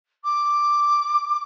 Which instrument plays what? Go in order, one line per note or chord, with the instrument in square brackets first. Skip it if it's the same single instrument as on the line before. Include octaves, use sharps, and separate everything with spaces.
[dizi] D6